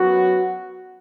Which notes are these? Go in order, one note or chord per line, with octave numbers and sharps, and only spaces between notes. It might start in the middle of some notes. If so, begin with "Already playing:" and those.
Already playing: F#2 F#3 B3 F#4